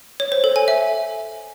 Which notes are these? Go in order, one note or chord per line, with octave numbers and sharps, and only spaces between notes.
C#5
C5
A4
G#5
E5